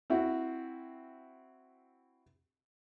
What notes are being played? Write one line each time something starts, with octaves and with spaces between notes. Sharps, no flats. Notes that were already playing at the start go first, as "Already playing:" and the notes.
C4 E4 F#4